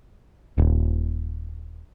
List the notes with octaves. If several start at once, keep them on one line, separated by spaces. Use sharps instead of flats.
D#1